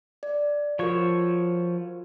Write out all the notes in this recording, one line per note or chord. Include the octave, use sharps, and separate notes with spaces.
D5
F3 F4 F#4 A#4 C#5